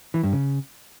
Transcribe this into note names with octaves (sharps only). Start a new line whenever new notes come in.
E3
G2
C#3